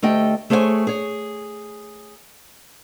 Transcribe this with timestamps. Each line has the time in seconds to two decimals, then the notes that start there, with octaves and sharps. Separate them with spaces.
0.02 D2 A3 G4 D#5 G5
0.50 A3 G#4 C5 C#5 E5 G#5
0.87 G#4 C#5